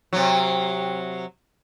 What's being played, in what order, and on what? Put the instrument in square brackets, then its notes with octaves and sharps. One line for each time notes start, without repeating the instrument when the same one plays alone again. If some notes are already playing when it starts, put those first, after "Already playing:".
[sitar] C3 F#3